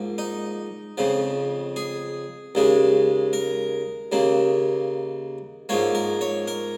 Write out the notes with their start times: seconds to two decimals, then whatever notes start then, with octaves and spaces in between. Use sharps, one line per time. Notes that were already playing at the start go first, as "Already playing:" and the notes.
Already playing: G#2 F3 A#3
0.18 D#4
0.98 F2 C#3 F3
1.76 G#4
2.55 D#2 C#3 G#3
3.33 A#4
4.12 D#2 C#3 A#3
5.69 G#2 F3 A#3 C#5
5.95 A#4
6.21 C#5
6.48 A#4